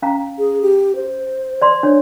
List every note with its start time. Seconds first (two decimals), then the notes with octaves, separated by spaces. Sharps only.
0.02 C#4 F5 A#5
0.39 G#4
0.62 G4
0.95 C5
1.62 D5 C6
1.83 D4 C#5